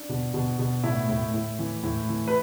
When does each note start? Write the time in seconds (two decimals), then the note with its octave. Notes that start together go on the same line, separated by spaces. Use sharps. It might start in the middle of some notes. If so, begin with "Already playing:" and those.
Already playing: D4
0.09 B2
0.34 B2
0.59 B2
0.84 A2 E4
1.09 A2
1.34 A2
1.59 E3
1.83 A2
2.09 E3
2.28 B4